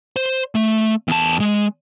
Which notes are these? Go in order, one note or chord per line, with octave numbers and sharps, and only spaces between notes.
C5
A3
E2 A5
G#3